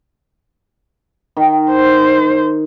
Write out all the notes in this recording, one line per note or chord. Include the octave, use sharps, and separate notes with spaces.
D#3
C5